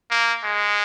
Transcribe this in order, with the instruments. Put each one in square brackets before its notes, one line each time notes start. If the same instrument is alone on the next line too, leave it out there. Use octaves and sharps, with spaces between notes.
[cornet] A#3
G#3